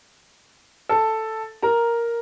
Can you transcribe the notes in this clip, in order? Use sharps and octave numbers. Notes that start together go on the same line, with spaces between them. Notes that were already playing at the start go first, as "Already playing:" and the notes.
A4 A5
A#4 A#5